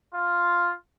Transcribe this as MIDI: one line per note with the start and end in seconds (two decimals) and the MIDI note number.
0.15 0.73 65